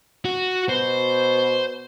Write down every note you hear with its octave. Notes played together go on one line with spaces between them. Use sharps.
F#4
B2 C5